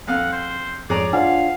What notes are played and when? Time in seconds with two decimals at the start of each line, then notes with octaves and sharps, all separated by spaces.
0.07 F2 F5 F#5
0.32 C5
0.90 F2 G#2 G#4 C#5 D5 A#5
1.13 D4 F4 C5 F5 F#5 G#5